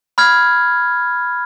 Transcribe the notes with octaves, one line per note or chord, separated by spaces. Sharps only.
B5 F6 G#6